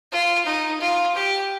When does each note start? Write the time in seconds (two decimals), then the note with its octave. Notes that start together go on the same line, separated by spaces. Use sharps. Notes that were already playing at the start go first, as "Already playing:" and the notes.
0.12 F4
0.46 D#4
0.81 F4
1.15 G4